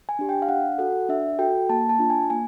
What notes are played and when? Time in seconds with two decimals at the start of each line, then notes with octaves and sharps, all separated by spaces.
0.09 G#5
0.19 D4 G4
0.29 G5
0.42 F5
0.49 D4 F#5
0.78 F#4 A4 F#5
1.09 D4 E5
1.39 F#4 A4 G5
1.69 A#3 A5
1.89 A5
1.99 D4 F4
2.10 G#5
2.30 A#3 G#5